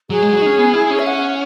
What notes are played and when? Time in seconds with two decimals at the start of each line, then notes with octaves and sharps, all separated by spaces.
0.10 F#3 G#4
0.22 G#3
0.34 F#4
0.42 D#4
0.46 C#4
0.58 B3
0.74 E4
0.91 C#4
0.99 E5
1.07 F#5